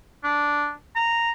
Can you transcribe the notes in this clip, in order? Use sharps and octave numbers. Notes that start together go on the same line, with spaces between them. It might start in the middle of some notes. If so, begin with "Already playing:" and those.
D4
A#5